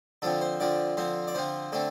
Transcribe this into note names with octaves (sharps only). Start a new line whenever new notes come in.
D3 F3 C4 A4
C5
D3 F3 C4 D5
D3 F3 C4 C5
D5
D3 F3 C4 C5
D3 A3 C4 A4